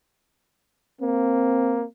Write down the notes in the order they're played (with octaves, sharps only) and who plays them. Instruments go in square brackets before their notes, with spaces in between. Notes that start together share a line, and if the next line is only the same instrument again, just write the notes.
[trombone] A#3 [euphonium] C4